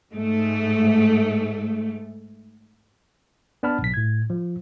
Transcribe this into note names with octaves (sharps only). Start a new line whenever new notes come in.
G#2 A3
B3 D4 A5 B5 F6
B1 B6
A2 G#6
F3